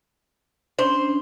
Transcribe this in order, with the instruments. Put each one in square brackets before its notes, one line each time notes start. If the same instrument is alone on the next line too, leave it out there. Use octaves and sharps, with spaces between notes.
[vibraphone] C#4 D4 [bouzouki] C5